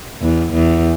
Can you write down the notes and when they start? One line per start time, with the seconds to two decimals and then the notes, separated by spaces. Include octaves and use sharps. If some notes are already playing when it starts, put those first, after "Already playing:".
0.21 E2
0.53 E2